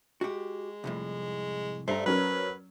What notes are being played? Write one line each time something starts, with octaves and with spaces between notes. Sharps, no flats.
G#3 F#4 G4
C2 F2 A2
G2 A3 C5 A#5
F#3 C#4 A#4 B4